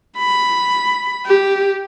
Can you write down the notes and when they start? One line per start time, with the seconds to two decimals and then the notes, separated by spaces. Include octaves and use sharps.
0.17 B5
1.26 G4